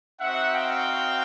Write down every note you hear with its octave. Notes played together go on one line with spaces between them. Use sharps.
C4 D#4 F#4 E5 F#5
F5 G5